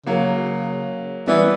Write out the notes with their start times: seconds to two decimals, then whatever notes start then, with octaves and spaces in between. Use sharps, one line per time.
0.06 C#3 F#3 A#3
1.27 E3 G3 B3